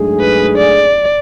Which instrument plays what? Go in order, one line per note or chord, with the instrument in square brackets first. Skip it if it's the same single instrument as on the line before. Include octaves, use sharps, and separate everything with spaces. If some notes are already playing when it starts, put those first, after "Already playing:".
Already playing: [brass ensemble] G#2 F#3 A3 D4 G#4
[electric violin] B4
D5